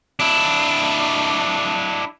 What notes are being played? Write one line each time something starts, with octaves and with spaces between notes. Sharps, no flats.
D4 E4